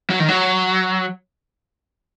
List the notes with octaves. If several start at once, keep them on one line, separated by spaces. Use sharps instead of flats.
F#3
D#3
F#3